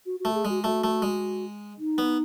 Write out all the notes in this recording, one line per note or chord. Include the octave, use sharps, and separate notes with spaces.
F#4
F#4
A3
G#4
G#3 F#4
A3 F#4
A3
G#3
D#4
B3